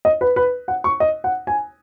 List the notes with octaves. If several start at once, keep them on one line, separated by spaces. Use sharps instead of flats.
D#5
B4
B4
F#5
C#6
D#5
F#5
G#5